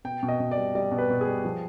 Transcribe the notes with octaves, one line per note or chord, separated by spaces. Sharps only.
B2 G5
B2
D#5
B2
D5
G3
G3 D5
B2
B4
B2
G#4
G3
F3